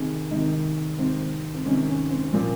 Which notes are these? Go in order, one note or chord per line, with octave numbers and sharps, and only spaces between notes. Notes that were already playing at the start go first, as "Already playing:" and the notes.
Already playing: C3 D#3 G#4
C3 D#3 D#4
C3 D#3 C4
C4
C3 D#3 C#4
C#4
C4
A#2 F3